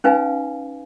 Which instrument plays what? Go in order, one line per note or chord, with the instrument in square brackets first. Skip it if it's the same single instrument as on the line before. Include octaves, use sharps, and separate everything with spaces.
[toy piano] C#4 D#4 B4 F5 G#5